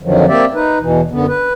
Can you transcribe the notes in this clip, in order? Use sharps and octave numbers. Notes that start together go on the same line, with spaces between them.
F2 D3 D#3 F3 F#3
A#3 C4 G4 D5 E5
D#4 B4
E2 B2 E3
F#2 D3 B3
B4